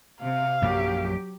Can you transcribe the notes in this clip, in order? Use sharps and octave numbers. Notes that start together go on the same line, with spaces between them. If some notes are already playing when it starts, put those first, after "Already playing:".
C3 F5
A#1 F#2 F#3 A#3 G4